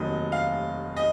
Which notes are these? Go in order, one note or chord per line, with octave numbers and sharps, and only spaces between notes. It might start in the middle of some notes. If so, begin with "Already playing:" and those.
Already playing: F1 D#2 D#3 F#3 D#5
F5
D#5